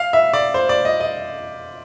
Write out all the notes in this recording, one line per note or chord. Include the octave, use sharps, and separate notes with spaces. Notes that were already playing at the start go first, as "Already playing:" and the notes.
Already playing: F5
E5
D5
C5
D5
D#5
D#5